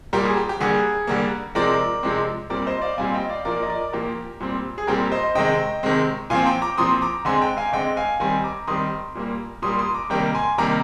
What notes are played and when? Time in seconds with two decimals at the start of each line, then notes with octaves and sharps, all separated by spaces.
0.13 A#2 G3 A#3 G4 A#4
0.25 G#4
0.37 G4
0.49 G4
0.60 D3 G3 A#3 G#4
1.07 D3 G3 A#3
1.55 C3 F3 G#3 C4 A#4 D5
2.03 C3 F3 G#3 C4
2.50 A#2 G3 C4 A#4 D5
2.67 C5 D#5
2.82 D5 F5
2.98 A#2 G3 C4 F5 G#5
3.14 D#5 G5
3.29 D5 F5
3.45 A#2 F3 A#3 A#4 D5
3.63 D#5
3.70 A#4 D5
3.92 A#2 F3 A#3 G4 A#4
4.40 A#2 G3 C4
4.78 G#4
4.87 A#2 G3 C4 G4 A#4
5.12 C5 D#5
5.35 C3 D#3 G#3 C4 D#5 G5
5.83 C3 D#3 G#3 C4
6.30 A#2 F3 C4 F5 G#5
6.46 G5 A#5
6.62 A#5 D6
6.78 A#2 F3 C4 C6 D#6
7.02 A#5 D6
7.25 D3 G#3 C4 G#5 C6
7.42 G5 A#5
7.57 F5 G#5
7.73 D3 G#3 C4 D#5 G5
7.97 F5 G#5
8.20 D#3 G3 C4 G#5 C6
8.44 A#5 D6
8.67 D#3 G3 C4 C6 D#6
9.15 A#2 G3 A#3
9.62 A#2 G3 A#3 C6 D#6
9.79 C6 D#6
9.94 A#5 D6
10.10 C3 D#3 G3 A#3 G5 A#5
10.35 G#5 C6
10.58 C3 D#3 G3 A#3 A#5 D6